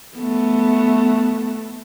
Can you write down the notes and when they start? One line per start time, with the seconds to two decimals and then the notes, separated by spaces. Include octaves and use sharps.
0.17 A3 B3